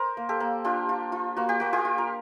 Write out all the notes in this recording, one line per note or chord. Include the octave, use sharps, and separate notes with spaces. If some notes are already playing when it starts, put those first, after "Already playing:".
Already playing: A#4 C5
A#3
G4 A4
A#3
D4 F4 G4
F4
F4
A#3 F#4
G4
A#3 F#4
F4 G4
F4
A#4